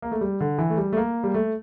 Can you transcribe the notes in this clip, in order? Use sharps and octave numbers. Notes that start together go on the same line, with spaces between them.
A#3
A3
G3
D3
E3
A3
G3
A3
A#3
G3
A3